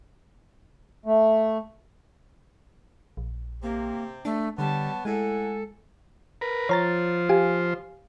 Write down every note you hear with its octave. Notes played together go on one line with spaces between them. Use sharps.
A3
A#1
C3 A#3 C4 G4
A3 D4
D3 G3 B3 C#5 A5
A2 G#3 A4 F#5 G#5
A#4 B4
F3 C5 C#5 A#5 A6
G4 F5 G#5